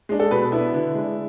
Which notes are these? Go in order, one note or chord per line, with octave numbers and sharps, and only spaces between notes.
G#3 D4
A4
B2 B4
B3 D4 E4
D3
G#3 D4